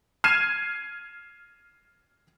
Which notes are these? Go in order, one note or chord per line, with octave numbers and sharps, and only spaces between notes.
F6 G#6 C7 D#7 E7